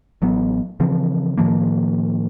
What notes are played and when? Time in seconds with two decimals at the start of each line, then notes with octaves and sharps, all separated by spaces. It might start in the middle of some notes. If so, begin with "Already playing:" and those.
0.22 A1 F#3 B3
0.80 C#3 E3 F3 C4
1.37 A2 D#3 F3 A#3